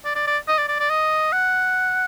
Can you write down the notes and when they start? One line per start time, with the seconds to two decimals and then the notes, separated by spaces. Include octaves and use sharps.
0.05 D5
0.16 D5
0.27 D5
0.48 D#5
0.58 D5
0.68 D5
0.80 D5
0.90 D#5
1.33 F#5